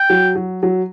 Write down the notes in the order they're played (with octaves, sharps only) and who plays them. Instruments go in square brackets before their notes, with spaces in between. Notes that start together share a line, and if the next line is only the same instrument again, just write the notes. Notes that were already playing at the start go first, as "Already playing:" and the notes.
Already playing: [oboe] G5
[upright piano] F#3
F#3
F#3